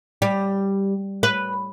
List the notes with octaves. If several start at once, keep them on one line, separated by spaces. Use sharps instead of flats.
G3
B4